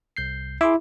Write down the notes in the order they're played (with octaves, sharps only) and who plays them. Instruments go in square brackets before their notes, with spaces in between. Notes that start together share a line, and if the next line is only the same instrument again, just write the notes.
[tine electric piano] C2 G6 C7
[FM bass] E4 [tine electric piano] G#4 C6 D6